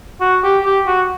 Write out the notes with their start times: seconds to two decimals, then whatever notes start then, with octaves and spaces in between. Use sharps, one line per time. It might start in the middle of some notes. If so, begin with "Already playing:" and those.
0.21 F#4
0.43 G4
0.64 G4
0.87 F#4